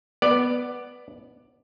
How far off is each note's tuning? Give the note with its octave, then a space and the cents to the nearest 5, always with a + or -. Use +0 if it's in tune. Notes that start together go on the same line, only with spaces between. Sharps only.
B3 +0 D5 +10